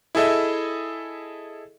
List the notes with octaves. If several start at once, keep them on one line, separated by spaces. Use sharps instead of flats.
E4 G#4 A4 D#5 E5